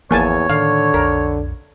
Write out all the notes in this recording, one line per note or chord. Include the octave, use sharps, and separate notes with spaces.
G#1 E2 F3 A#3 C#5 G#5 A5
A2 D3 D#3 F5
B1 F2 A#4